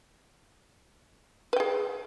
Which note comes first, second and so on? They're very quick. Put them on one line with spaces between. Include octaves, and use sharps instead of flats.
B4 G5 G#4